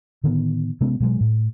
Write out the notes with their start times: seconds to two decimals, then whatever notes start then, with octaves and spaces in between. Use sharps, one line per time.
0.24 A2 D3 D#3 B3
0.81 C3 G#3 B3 C#4
1.00 B2 F#3 G#3
1.21 A2